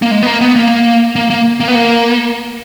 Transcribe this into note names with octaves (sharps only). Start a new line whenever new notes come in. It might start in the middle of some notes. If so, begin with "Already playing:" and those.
A#3
G#3
B3
A#3
B3
A#3
A#3
A#3
A#3
B3
A#3